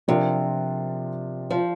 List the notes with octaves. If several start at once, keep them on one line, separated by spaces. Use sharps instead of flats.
C3 F3 D4 F4 A#4
F3